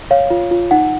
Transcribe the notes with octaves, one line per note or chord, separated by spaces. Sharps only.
C#5 F5
F4
F4
D#4 F#5